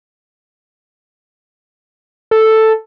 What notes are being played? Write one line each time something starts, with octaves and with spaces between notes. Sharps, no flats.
A4